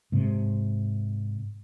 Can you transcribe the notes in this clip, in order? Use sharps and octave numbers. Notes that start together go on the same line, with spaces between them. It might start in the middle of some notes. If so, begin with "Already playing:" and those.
G#2 C3